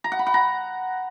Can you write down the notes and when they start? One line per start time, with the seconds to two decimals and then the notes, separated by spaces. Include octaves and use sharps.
0.04 A#5
0.12 F#5
0.19 B5
0.27 F#5
0.34 A#5